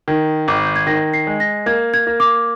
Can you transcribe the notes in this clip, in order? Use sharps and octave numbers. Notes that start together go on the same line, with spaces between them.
D#3 G#6
G#1
G6
G#6
D#3 A#6
C7
G#3
A#6
A#3 G#6
G#6
A#3
D6